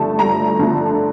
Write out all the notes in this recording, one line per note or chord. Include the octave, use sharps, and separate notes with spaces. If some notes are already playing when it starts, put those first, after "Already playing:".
Already playing: G2 D3 F3 A3 A5
G2 A#5
D3 F3 A3